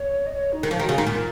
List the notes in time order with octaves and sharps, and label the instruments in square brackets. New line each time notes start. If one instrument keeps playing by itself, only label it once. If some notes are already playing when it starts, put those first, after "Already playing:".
Already playing: [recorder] C#5
D#5
C#5
D#4
[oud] D#3
F3
D#3
[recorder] F#4
[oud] C#3
[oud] D#3 [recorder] F5
[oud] A#2